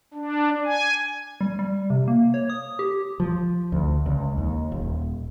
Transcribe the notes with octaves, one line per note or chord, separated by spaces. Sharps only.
D4
G#5
G3
G3
C3
A#3
C#5
D#6
G4
F3
D2
C#2
D#2
D#1